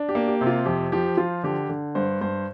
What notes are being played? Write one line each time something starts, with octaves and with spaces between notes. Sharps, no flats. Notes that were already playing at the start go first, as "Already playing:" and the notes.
Already playing: D4
G4
A#3
G4
C3
F4
F2 G4
F3 G4
F3 F4
D3 G4
D3
G2 C5
G2 C5